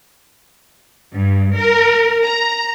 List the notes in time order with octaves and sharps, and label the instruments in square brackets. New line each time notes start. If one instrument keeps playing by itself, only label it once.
[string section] G2
A#4
A#5